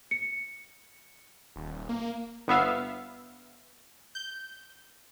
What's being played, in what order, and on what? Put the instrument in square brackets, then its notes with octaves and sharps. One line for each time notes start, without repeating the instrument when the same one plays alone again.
[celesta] C#7
[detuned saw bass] D#1
A#3
[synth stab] G1 B3 E5 F5
G6